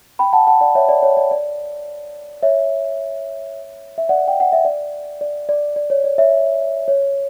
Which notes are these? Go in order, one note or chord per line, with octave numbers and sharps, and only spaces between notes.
G5 B5
F#5 A5
F#5 A5
D5 F#5
C#5 E5
D5
C#5
D5
D5
C#5 E5
E5
D5 F#5
G5
F#5
E5
D5
D5
D5
D5
C#5
D5
C#5 E5
C#5